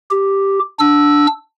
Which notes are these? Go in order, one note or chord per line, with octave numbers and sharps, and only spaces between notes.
G4
D4 E6